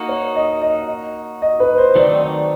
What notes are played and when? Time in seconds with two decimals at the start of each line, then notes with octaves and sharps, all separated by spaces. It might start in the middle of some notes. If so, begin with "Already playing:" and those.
Already playing: A#3 D#4 F#4
0.09 C#5
0.36 D#5
0.62 D#5
1.42 D#5
1.60 B4
1.78 C5
1.95 D#3 F#3 A3 C4 D#4 D5
2.22 D5